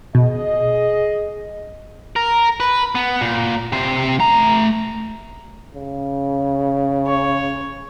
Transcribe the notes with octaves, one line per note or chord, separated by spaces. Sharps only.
B2 G#4 D#5
A#4
B4
B3
A#2
C3 C5
A3 A#5
C#3
C#5